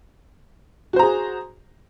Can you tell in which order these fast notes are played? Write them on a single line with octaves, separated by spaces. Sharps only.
F#4 C5 A#5 G#4